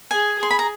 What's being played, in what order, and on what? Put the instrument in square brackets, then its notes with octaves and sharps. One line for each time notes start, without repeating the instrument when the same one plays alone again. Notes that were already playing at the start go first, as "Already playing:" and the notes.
[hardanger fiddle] G#4 [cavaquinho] G#5
[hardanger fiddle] G#4 [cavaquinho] C6
[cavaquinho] B5
A#5